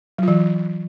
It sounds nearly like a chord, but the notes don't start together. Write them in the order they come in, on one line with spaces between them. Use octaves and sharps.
F#3 F4 E3